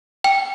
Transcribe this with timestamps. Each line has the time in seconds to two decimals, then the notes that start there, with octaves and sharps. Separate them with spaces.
0.24 G5